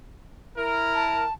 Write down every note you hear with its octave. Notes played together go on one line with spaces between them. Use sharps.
E4 A#4
A5